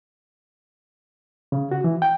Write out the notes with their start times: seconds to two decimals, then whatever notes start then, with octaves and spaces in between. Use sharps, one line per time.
1.52 C#3
1.71 F#4
1.84 E3
2.02 G5